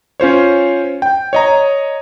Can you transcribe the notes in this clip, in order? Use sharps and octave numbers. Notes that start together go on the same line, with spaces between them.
C#4 F4 C5 C#5
G5
C#5 D#5 A#5